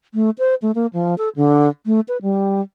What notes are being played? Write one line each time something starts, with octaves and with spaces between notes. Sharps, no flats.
A3
C5
A3
A#3
F3
A4
D3
A3
B4
G3